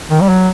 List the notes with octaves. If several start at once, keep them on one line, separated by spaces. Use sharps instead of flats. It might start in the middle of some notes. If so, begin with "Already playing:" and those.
D#3
G3
F#3